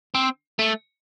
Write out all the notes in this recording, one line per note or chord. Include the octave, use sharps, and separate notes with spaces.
C4
A3